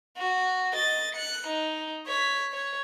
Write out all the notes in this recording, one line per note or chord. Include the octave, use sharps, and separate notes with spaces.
F#4
D#5 A6
F#6 C#7
D#4
C#5 B6
C#5